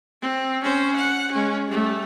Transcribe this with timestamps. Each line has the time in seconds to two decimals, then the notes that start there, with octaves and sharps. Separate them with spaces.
0.22 C4
0.63 C#4 C5
0.96 F#5
1.32 G#3 C#4
1.68 G3 A3